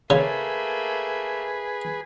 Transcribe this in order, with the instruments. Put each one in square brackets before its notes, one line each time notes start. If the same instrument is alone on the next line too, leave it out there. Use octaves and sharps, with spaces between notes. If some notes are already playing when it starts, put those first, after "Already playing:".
[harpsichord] C#3 [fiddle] A3 A#3 [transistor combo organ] G#4 B4